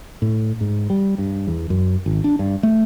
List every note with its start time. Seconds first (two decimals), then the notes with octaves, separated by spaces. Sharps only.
0.22 A2
0.61 G#2
0.90 G3
1.18 G2
1.47 E2
1.70 F#2
2.06 G#1
2.24 D4
2.39 G2
2.63 A3